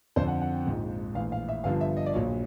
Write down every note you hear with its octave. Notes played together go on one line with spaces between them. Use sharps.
F2 D3 F3 C5
F#5
F#5
G5
A#1 G#2 F3
A#1 A2 E3 F5
F5
E5
G1 G2 D3 F3 F5
E5
D#5
D5
A#1 A#2 F#3 C#5